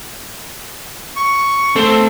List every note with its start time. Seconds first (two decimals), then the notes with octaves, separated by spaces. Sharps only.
1.16 C#6
1.76 A3 C4 A4